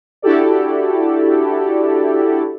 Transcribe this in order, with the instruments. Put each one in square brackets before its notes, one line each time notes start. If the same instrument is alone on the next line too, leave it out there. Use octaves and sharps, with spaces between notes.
[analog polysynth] D4 E4 F#4 G4 A4 D5